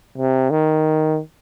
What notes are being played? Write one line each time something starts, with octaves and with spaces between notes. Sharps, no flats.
C3
D#3